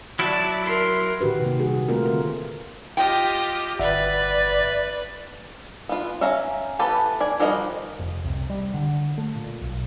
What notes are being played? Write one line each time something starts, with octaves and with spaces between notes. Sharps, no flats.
F#3 E4 D5 A5
A#4 C6
A#2 D#3 F#4 G4 B4
C3 A#3
C3 G3 F#4 G#4
A3 A#3 C4 F4 A#4 B4
D3 F4 A#4
F4 G4 D#5 G5
G1 B4 D5 E5 F#5
B3 F4
C#4 E5 F5 A#5
E3 B3 G4 A4 B4
D5 G#5
F3 G3 F#4 A#4 D#5
F1
C2
G3
D3
A3
A#2
B1